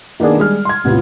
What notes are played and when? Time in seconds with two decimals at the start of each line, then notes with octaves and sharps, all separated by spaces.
0.20 D#3 A#3 B3 D4 G#4
0.37 G3 G#3 G#4 F6
0.65 C6 G#6
0.84 E1 A1 C3 B3 E4 F4